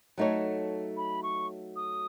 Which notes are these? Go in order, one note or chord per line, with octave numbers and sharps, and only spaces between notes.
F#3 A3 D#4 A4 C#5
B5
C#6
D#6